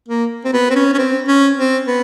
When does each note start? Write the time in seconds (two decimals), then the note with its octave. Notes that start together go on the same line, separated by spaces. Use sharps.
0.09 A#3
0.45 C4
0.53 B3
0.70 C4
0.75 C#4
0.94 C#4
0.98 C4
1.28 C#4
1.58 C4
1.88 B3